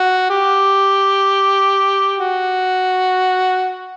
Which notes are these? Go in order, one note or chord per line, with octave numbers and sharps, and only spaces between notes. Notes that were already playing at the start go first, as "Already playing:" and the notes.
Already playing: F#4
G4
F#4